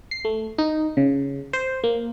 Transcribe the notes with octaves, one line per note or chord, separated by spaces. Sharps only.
C7
A3
D#4
C#3
C5
A#3